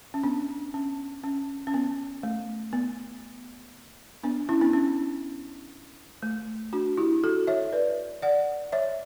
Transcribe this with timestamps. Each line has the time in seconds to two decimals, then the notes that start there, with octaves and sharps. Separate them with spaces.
0.14 C#4
0.23 B3 D4
0.74 C#4
1.24 C#4
1.67 C#4
1.74 B3
2.23 A3
2.73 B3
4.23 B3 D4
4.49 C#4 E4
4.61 B3 D4
4.73 C#4
6.23 A3
6.73 D4 F#4
6.97 E4 G4
7.24 F#4 A4
7.47 C#5 E5
7.72 B4 D5
8.22 D5 F#5
8.72 C#5 E5